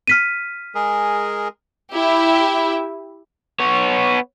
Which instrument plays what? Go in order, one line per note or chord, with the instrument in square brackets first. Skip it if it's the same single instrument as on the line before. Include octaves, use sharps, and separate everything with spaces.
[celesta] F6 B6 D#7
[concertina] G#3 G#4 A#4
[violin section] E4 G4 E5
[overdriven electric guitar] B3 C#5